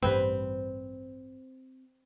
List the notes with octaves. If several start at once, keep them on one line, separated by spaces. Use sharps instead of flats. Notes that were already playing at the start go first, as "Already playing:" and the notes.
A1 G2 G3 C4 B4 C5